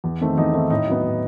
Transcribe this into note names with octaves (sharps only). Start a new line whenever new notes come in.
E2
D#3 A3 C4
E2 D#4
D#3 A3 C4
A2 D#4
F#3 B3
A2